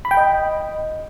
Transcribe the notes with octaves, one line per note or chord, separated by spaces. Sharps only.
B5
G5
D#5